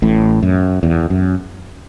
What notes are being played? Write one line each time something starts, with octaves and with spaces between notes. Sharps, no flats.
A1 A2
F#2
E2
F#2